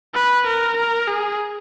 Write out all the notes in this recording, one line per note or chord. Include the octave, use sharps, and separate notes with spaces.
B4
A#4
A#4
G#4